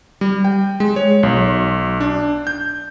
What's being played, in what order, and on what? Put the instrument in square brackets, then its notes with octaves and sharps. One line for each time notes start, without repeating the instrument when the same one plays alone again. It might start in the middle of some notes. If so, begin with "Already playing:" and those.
[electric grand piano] G3
G5
G#3
C#5
B1
D4
G6